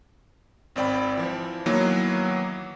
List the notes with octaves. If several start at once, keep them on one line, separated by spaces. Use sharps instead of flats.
G#1 C4 D5 G5 B5
E3 F3
D#3 E3 F#3 A#3 B3